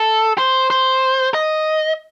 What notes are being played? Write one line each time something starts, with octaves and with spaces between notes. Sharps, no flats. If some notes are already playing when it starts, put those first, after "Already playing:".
Already playing: A4
C5
C5
D#5